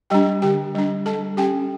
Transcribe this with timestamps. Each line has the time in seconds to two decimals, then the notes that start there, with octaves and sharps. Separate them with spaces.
0.10 G3 D4 G4 G5
0.42 D3 G4 G5
0.75 G3 D4
1.06 G3 A4 A5
1.37 C#4 G4 G5